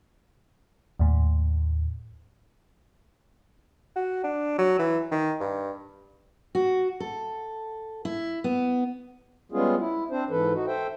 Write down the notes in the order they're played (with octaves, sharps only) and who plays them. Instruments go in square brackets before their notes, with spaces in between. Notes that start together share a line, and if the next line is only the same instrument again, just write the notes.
[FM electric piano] D#2 A2
[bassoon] F#4
D4
F#3
E3
D#3
G2
[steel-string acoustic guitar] F#4
A4
E4
B3
[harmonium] G3 G#3 B3 C#4 F4 G#4
E4
C4 D4 C5
G#2 E3 A4 B4
D#4 F#4
A4 C5 E5 G5